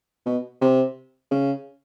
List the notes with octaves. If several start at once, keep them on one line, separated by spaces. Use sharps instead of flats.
B2
C3
C#3